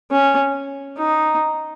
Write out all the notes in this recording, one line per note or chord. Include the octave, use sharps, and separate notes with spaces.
C#4
D#4